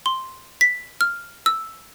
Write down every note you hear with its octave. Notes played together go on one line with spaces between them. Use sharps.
C6
B6
F6
E6